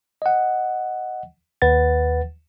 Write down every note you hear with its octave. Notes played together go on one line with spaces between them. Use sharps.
D#5 F#5
D#2 B4 F#5 A6